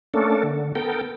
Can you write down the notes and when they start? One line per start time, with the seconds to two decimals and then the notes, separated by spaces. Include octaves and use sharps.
0.14 A3 A#3 C#4 D4 A4
0.43 D3
0.75 B3 A4 A#4 G5